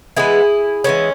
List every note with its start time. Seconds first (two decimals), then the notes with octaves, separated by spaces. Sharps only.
0.16 E3 G#3 B3 E4 G#4
0.84 E3 G#3 B3 C#4